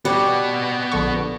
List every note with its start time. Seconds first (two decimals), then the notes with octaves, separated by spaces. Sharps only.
0.05 G3 B3 F#4 F#5
0.92 A#1 D3 C#6